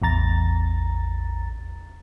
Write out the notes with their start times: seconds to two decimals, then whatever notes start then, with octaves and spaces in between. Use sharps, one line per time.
0.02 A1 E2 A#5 A6